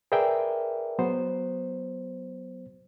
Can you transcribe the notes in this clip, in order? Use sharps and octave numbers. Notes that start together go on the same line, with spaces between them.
G#4 A#4 B4 D5 E5 G5
F#3 B3 C5